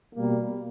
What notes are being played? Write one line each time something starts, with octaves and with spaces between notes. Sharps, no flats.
B2 G3 A#3